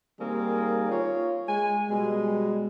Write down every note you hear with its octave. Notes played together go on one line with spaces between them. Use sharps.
D#3 G3 A#3 C4 G#4
F4 C#5
G#3 G#5
B2 G3 G#3